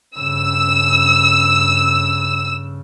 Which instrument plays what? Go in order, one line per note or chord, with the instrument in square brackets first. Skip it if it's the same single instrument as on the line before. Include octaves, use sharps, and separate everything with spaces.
[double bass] G2 C#3 [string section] E6